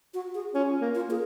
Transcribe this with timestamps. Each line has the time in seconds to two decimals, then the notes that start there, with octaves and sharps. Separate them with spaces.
0.14 F#4
0.35 G#4
0.54 C#4 F4
0.81 A#3
0.95 F4
1.08 A#3 G#4